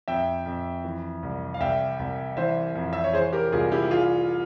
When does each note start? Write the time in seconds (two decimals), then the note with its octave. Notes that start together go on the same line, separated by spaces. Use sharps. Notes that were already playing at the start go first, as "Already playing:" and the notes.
0.08 F2 E5 G5
0.46 F2
0.84 E3
1.23 C2
1.54 F5
1.60 C2 E5 G5
1.99 C2
2.37 E3 C5 E5
2.75 F2
2.93 E5
3.04 C#5
3.13 E3 G#4 C5
3.32 G4 A#4
3.52 C2 F4 G#4
3.72 E4 G4
3.90 E3 F4 G#4